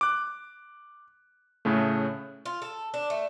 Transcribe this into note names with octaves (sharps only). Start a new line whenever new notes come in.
D6 F#6
A2 C#3 A3
F4
A4
D4
A3